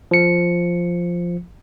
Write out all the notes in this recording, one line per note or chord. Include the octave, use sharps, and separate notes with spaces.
F3 C#7